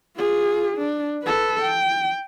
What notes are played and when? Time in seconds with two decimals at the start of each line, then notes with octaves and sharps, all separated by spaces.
0.16 F4 G#4
0.77 D4
1.23 A4 B4
1.62 G5